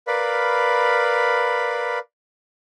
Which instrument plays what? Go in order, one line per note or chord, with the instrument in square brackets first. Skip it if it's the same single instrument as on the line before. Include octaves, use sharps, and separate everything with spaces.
[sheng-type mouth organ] A#4 B4 D5 F5 B5